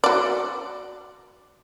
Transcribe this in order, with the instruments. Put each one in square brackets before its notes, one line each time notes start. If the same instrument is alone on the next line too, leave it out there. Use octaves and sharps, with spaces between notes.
[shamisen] F#4 D5